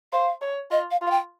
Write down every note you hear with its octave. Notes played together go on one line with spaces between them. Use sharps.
C5 F5
C#5
F4 D#5
F5
F4
F5
G5